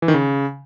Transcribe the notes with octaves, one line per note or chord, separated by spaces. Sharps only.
E3
D#3
C#3